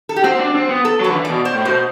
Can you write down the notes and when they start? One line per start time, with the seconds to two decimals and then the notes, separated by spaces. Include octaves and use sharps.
0.09 A4
0.16 G4
0.24 C4 F#4
0.40 D4
0.55 C4
0.70 B3
0.85 A4
1.00 F#3 B4
1.10 D3
1.15 E3
1.25 B2 D5
1.45 C5
1.55 A2
1.65 B2 C5